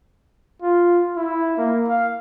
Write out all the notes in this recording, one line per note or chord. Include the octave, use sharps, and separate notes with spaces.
F4
E4
A#3
F5